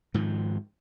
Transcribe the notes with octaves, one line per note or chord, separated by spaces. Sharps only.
G#2 D#3 F3